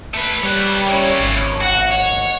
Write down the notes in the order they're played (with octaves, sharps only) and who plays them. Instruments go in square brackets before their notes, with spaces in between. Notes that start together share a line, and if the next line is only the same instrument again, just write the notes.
[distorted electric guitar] A3 B4
[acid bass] G3 [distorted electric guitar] B4 C#5
[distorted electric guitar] A#3 E4 [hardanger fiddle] C#4 C#5
[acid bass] G#1
[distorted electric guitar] F#4 [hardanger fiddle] F#5
[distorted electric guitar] C#5